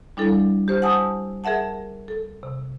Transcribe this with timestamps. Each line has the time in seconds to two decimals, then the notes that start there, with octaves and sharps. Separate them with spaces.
0.17 G3 D4 E4 A4
0.68 G4 C5 F6
0.82 F#5 G#5 A5 D#6 E6
1.44 G#4 A#4 E5 F#5 A5
2.08 A4
2.43 C3